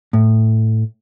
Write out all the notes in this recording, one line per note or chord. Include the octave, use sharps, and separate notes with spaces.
A2